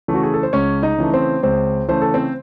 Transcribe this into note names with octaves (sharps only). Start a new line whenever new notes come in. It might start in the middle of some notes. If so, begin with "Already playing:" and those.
C#3 E3 A3
F#4
G#4
A4
C5
C#2 C#4 C#5
D#4 D#5
C#3 E3 A3
C4 C5
C#2 C4 C5
C#3 E3 A3 C5
A4
C4 C5